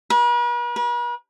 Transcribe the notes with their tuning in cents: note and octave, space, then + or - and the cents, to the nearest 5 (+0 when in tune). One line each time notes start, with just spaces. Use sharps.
B4 -45
B4 -45